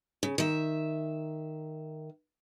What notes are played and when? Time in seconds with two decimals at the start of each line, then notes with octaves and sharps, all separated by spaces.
0.23 C#3
0.38 D#3 E5